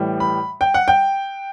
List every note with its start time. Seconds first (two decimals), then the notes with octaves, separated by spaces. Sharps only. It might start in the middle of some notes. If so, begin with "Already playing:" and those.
Already playing: A2 E3 G3
0.20 B5
0.61 G5
0.74 F#5
0.88 G5